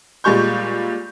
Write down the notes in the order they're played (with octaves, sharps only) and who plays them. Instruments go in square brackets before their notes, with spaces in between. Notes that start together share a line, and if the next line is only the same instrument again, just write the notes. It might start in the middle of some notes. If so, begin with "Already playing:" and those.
[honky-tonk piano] A#2 G3 G#3 C#6 G6